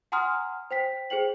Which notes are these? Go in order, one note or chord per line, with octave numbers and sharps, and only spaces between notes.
F#5 G#5 A#5 C6 D#6 F6
C5 G5 B6
G#4 C5 G5 F#7